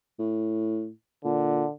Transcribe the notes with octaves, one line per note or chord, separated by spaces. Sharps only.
A2
A#2 D3